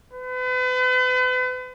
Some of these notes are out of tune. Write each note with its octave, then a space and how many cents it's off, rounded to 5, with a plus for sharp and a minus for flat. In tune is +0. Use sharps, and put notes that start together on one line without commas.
B4 +40